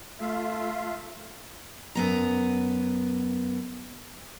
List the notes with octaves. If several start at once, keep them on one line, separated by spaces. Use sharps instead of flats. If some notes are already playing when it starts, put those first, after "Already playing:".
A3 F4 E5 F5
F#2 B3 A#5